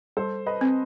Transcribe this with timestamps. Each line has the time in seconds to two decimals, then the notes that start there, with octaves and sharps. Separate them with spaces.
0.17 G3 A4 C5
0.46 B4 D#5
0.61 C4